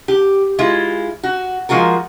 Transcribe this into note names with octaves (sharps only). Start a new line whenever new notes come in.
G4
G#3 E4 F4
F#4
F3 G#3 F4 F#4 A#4